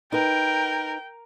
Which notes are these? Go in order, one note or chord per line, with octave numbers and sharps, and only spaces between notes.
D#4 A#4 B4 G5